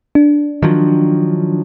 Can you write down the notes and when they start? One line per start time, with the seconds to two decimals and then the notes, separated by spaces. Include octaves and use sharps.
0.15 D4
0.62 D#3 F3 F#3